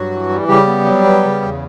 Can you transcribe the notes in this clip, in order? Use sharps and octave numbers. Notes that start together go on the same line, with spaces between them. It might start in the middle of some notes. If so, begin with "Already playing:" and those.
Already playing: G2 F#3 F#4
E3
G3
C#3 G3 G4
B3
F#3
B3
C#3
E2